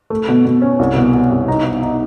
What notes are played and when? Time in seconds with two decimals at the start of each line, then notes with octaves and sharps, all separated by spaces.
0.10 A3
0.28 B2
0.45 B2
0.62 C#4
0.79 C2
0.96 B2
1.14 B2
1.30 C2
1.48 D#4
1.65 D#4
1.83 D#4